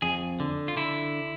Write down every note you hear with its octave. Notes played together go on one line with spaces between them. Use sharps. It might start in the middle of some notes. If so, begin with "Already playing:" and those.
F2 G#4
D3
F4
D3 E4